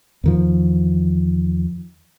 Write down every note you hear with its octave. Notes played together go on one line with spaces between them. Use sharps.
E2 D#3 F3